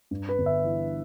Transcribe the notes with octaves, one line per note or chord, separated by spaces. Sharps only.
G2
B4
G1
E5
E3